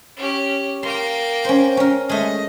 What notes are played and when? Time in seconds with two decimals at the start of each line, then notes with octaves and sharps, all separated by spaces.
0.17 C#4 G4
0.83 A#3 G5 C6
1.45 C#4 C5
1.77 C#4 A#4
2.09 G#3 A3 D#5